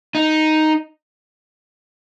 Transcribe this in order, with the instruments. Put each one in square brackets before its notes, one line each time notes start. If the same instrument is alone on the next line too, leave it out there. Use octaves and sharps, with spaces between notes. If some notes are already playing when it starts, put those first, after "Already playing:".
[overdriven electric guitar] D#4